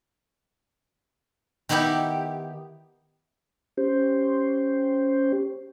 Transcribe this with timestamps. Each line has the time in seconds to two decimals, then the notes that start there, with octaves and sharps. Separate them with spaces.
1.69 D#3 B3 D#4 E4 G4
3.77 C#4 G4 C5